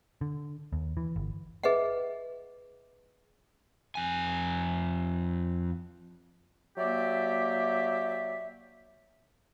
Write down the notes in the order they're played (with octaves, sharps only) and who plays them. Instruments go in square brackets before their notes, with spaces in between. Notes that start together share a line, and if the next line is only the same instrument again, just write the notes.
[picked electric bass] D3
D#2
E3
G1
[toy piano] G#4 B4 D#5 E5 F#5
[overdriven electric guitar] F2 G#5
[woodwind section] F#3 A#3 G4 D5 E5